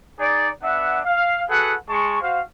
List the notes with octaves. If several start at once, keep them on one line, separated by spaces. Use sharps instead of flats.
D#4 G#4 D5
B3 D4 E5 F#5
F5
F#4 G#4 A4 B4 F#5
G#3 A5 C#6
F#4 C5 F5